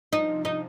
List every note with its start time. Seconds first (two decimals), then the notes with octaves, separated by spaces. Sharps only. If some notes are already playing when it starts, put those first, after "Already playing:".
0.12 F3 D#4
0.28 C3
0.45 F3 D#4